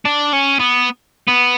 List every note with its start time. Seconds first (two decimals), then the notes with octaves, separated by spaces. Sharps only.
0.05 D4
0.33 C#4
0.59 B3
1.28 B3